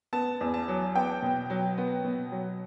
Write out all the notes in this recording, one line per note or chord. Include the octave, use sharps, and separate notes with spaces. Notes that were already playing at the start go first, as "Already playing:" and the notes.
B3 A5
E2
A5
F#3
B3 G5
B2
F#3
B3
B2
F#3